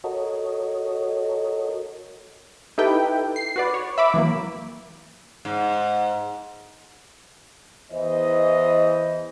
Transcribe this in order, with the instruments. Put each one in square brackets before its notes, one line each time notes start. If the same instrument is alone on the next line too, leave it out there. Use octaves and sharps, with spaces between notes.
[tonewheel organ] F#4 A4 A#4 C#5 D#5
[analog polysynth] D#4 E4 G4 A4 B4 G5
C7
F#4 B4 D5
C#5
E5 B5 D6
E3 F#3 A#3
[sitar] G#2
[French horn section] E2 E3 C5 D#5